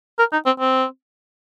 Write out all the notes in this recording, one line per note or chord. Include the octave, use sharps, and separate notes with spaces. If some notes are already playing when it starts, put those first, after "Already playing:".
A#4
D#4
C4
C4